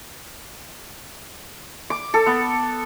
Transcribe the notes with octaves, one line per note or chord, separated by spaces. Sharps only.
D6
A4
B3